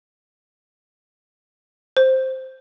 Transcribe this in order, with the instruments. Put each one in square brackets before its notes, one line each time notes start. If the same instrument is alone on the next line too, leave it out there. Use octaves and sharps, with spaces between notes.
[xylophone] C5